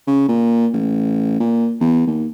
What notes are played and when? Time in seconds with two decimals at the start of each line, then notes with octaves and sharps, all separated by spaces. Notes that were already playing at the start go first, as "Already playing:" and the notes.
0.07 C#3
0.28 A#2
0.73 A1
1.40 A#2
1.81 E2
2.07 D#2